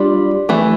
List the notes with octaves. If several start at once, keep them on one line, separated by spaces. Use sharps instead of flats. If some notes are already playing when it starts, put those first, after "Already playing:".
Already playing: G3 D4 F4
E3 A3